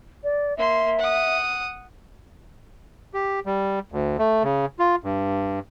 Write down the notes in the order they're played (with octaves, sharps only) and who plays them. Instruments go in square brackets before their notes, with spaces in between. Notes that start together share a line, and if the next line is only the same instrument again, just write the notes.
[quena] D5
[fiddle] A#3 C6 [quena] E5
[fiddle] F#5 D#6
[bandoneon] G4
G3
D2
A3
C#3
F4
G2